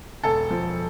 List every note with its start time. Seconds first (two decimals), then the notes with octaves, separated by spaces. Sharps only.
0.23 E1 A4
0.51 F3